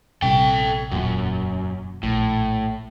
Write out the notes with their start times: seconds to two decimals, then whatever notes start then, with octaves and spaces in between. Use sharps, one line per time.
0.22 A#1 C3 G3 A4 G5
0.91 E1 F#2 A#2
2.03 A#1 A2